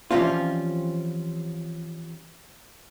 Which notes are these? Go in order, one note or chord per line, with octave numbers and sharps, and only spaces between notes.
E3 F3 G3 C4 C#4 F4